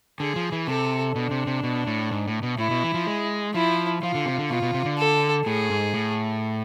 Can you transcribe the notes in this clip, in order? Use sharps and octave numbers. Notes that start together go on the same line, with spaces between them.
D3 G#4
F3
E3
C3 A4
B2 D4
C3
C3
B2
A2
G#2
A2
B2
A2 E4
B2
E3
F3
G#3
F3 E4
F3 F4
D3
C3
D3
B2 F4
B2
C3
D3
A4
A2 G#4
G#2
A2